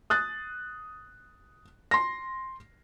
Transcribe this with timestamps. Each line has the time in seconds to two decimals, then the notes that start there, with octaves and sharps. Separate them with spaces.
0.10 D#6 F#6 A6
1.91 C6 A#6